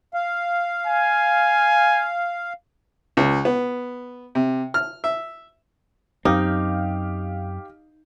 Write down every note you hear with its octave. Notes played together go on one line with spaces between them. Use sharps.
F5
G#5
C#2
B3
C3
F6
E5
F#2 C4 D#4 G4 F5